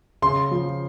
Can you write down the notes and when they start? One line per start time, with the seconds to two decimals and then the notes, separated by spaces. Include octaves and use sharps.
0.22 C#3 C6
0.51 F3